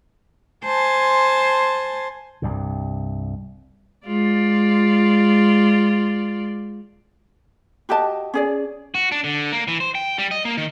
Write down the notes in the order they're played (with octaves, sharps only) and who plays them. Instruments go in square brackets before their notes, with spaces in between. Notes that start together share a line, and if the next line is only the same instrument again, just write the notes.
[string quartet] C5 G#5 A5 C6
[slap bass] C2 G2 C3
[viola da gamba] G#3 F4 D5
[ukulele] F#4 G4 D#5 A5
C#4 G#4 D5
[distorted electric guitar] F#4
D4
D3
A#3
E3
C5
G5
G3
D#5
A#3
D#3